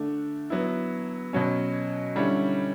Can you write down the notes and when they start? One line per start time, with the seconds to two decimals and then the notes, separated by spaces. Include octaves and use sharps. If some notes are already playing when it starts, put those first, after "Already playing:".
Already playing: D3 A3 D4
0.50 F#3 B3 E4
1.33 B2 F#3 C#4
2.15 D3 G3 C#4 E4